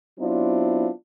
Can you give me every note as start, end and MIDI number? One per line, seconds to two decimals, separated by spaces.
0.19 0.90 54
0.19 0.90 59
0.19 0.90 60
0.19 0.90 62
0.19 0.90 64
0.19 0.90 65